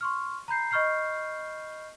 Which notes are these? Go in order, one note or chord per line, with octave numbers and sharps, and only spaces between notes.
C6 C#6 F6
A#5 B5 G6 C7
D#5 B5 C#6 F6 G6 C7